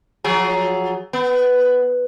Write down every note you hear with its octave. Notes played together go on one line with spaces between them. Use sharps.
F3 F#3 G#4
B3